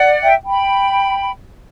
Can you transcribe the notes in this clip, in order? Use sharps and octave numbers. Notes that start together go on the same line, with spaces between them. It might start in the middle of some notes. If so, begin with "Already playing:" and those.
Already playing: D5 F#5
E5 G5
G5 B5